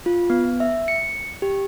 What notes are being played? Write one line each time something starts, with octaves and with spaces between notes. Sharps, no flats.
F4
B3
E5
C#7
G4